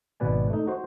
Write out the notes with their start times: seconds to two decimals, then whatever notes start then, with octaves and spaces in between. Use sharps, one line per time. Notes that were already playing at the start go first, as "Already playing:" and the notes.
0.20 G#1 B2 B4 D5 G#5
0.50 A3 D#4
0.67 F#4 C5